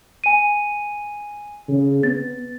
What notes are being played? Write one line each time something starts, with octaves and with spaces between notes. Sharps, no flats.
G#5 D#7
C#3
B3 A6